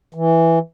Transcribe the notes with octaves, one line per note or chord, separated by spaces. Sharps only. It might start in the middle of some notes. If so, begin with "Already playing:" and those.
E3